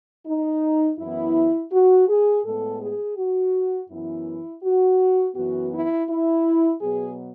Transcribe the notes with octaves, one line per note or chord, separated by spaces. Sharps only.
D#4
F#2 E3 B3 E4
F#4
G#4
A2 G#3 B3 A4
G#4
F#4
F#2 E3 B3 E4
F#4
F#2 E3 B3 F#4
E4
E4
B2 F#3 B3 G#4